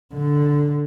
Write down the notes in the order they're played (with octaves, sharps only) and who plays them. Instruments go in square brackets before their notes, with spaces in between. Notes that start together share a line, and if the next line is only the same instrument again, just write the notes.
[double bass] D3